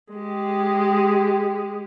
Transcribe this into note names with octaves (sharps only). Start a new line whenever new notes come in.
G#3 G4